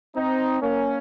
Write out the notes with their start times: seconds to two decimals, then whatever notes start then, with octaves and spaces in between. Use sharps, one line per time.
0.15 C4 D#4
0.62 A#3 C#4